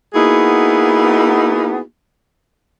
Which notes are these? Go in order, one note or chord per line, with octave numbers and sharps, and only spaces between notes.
A#3 B3 D#4 E4 F#4 G#4